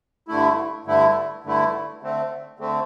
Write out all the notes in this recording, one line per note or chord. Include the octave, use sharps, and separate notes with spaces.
G2 D3 A3 E4
G2 D3 A3 E4
G2 D3 A3 E4
D3 A3 C4
D3 A3 C4